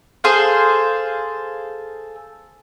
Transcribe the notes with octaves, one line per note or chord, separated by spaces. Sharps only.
G#4 A4 C5 F5